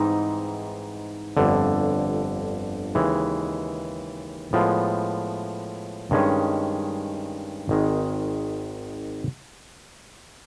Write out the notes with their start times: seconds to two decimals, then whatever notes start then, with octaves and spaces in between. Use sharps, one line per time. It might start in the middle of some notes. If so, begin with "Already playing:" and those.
Already playing: G#2 E3 G3 C4 D#4
1.37 G1 F2 D3
2.95 D#2 C#3 E3 G#3
4.53 A2 F3 G#3 B3
6.11 G2 D#3 G#3 C#4
7.69 G#1 D#3 G#3